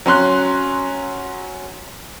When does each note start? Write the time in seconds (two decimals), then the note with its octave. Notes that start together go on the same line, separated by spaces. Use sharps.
0.06 F#3 C#4 C6 F#6